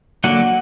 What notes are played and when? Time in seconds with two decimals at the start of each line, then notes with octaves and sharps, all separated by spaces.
0.24 D3 F#3 A#3 D4 F#5